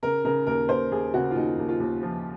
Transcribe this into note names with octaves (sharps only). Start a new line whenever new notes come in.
C#3 A#4
C#3 A#4
D#2 A#4
D#2 C5
D#2 G#4
C#3 F#4
F4
D#2 D#4
D#2
F4
D#2
F3